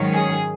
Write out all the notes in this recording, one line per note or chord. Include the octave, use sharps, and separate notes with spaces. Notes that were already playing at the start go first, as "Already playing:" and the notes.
Already playing: G#2 D#3 F#3 C#4
G#4